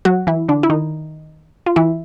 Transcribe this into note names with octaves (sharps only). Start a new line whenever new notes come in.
F#3 F#4
E3 E4
D3 D4
E4
D#3 D#4
F4
E3 E4